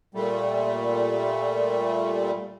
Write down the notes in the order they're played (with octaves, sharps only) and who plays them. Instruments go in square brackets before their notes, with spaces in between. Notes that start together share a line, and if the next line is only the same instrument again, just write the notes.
[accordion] A#2 G3 A3